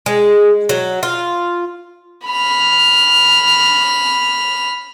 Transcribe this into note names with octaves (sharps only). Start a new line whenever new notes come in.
G#3
F#3
F4
B5 F6